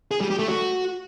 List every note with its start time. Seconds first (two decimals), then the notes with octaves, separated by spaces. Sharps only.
0.11 G#4
0.21 G3
0.30 G4
0.39 A3
0.48 F#4